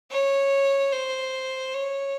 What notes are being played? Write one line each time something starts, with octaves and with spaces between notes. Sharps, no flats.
C#5
C5
C#5